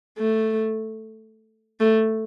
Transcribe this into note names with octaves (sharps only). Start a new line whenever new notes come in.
A3
A3